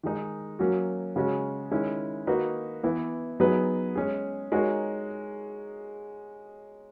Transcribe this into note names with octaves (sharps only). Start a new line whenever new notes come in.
D#3 G#3 D#4
F#3 A#3 C#4 F#4
C#3 G#3 C#4 F#4
D#3 G#3 C#4 E4
D#3 A#3 D#4 F#4 B4
E3 B3 E4
F#3 B3 D#4 G#4 B4
G#3 C#4 G#4
G#3 D#4 F#4 A#4 C#5